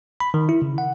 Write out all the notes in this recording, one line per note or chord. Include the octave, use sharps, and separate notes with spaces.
B5
D#3
E4
C#3
F#5